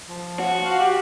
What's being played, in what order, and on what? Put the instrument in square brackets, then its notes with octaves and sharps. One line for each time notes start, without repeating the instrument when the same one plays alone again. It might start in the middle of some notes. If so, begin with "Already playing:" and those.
[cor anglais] F3
[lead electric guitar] F#4
[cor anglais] F5
G4